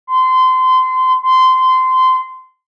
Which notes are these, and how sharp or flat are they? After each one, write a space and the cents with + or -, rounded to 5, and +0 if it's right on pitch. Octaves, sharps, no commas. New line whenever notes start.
C6 -25
C6 -20